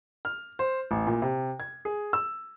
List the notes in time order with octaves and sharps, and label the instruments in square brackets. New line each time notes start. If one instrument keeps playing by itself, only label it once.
[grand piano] F6
C5
A1
A#2
C3
G#6
G#4
E6